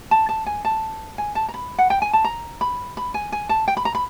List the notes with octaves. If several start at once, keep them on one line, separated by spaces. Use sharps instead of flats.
A5
A5
G#5
A5
G#5
A5
A#5
B5
F#5
G5
G#5
A5
A#5
B5
B5
G#5
G#5
A5
G5
B5
A#5
B5